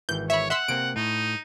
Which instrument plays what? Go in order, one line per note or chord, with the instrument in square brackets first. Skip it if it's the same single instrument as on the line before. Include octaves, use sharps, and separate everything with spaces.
[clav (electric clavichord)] G#1 E3 [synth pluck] G6
[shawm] C#5 [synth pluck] E5 B5
[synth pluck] E5 C6 E6 [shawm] F#5
[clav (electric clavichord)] C3 A#3 C4 [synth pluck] D7
[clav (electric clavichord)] A2 [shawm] D#4